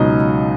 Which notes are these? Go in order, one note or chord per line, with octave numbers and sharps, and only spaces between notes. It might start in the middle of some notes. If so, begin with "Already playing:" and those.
Already playing: C#2 B2 F#3 D#4 D#5